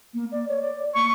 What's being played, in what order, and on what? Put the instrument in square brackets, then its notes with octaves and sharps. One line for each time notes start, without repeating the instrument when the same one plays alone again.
[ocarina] A#3
D5
C#5
D5
[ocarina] A#3 [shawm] C#6